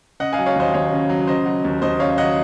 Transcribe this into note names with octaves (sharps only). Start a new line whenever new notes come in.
C#3 D#5 F#5
F5 G#5
F#3
C#5 F5
D#2 C5 D#5
D#2 C#5 F5
C#3
F#3
C#3 C5 D#5
F#3
D#2
D#2 C5 D#5
C#3 C#5 F5
F#3 D#5 F#5